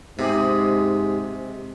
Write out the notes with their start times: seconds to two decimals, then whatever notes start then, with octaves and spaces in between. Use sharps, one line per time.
0.19 G#2 C3 G4 G#4